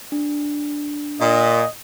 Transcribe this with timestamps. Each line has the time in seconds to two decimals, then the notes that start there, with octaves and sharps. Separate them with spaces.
0.12 D4
1.21 A#2 D#5